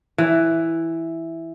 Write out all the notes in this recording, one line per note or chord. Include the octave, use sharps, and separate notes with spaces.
E3